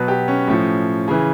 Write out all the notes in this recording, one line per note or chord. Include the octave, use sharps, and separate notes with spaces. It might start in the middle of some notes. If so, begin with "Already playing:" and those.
Already playing: B2 F#3 B4
G4
C#4
A2 F3 C#4
C#3 E3